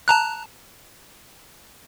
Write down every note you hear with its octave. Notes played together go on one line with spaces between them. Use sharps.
A5 A#5 F#6